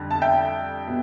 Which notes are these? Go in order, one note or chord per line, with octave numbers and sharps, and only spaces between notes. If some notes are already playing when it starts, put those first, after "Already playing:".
Already playing: F2 D3 G3
A5
E5 G5
B2